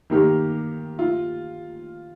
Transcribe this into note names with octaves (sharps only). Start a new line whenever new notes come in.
D#3 A#3 G4
F4